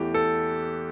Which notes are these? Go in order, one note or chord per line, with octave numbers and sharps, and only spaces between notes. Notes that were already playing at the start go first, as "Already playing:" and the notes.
Already playing: E2 E3 A3 G4
A4